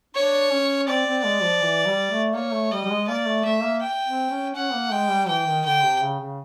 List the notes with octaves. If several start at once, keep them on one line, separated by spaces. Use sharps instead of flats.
D4 C#5
C#4
C4 D5
C4
G#3
F3
E3
G3
A3
A#3 C#5
A3
G3 D#5
G3
G#3
A#3 D5
A3
A3 E5
A#3
G5
C4
C#4
C#4 F#5
A#3
G#3 G5
G3
E3 G5
D#3
D3 G5
C3
C#3
C#3